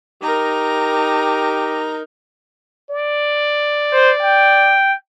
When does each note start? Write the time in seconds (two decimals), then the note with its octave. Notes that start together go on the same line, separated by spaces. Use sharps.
0.22 D#4 G4 A#4 A#5
2.90 D5
3.93 C5
4.23 G5